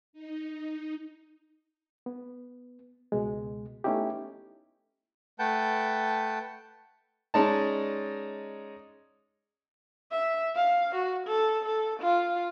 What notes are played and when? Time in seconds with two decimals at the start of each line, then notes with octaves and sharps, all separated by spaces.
0.13 D#4
2.06 B3
3.12 C#2 B2 G#3
3.84 A3 B3 C#4 D#4 E4 G4
5.39 A3 B4 F#5 G5 A5 G6
7.34 G#3 C#4 D#4 D5 A5
10.11 E5
10.55 F5
10.95 F#4
11.27 A4
11.65 A4
12.00 F4